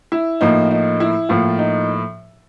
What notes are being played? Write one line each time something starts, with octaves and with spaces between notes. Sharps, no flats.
E4
A2 F3 A#3 D#4
D#4
E4
A2 F3 A#3 F4
D#4